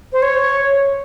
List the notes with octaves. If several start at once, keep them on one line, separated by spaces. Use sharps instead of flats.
C5
C#5